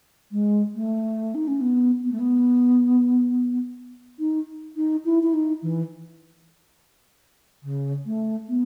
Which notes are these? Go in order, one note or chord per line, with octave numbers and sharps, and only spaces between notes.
G#3
A3
D#4
C#4
B3
B3
A3
B3
D#4
D#4
E4
E4
D#4
E3
C#3
A3
B3